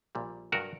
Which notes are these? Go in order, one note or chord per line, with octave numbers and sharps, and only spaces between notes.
A#1 A#2 G3
G2 F#3 F#4 A#4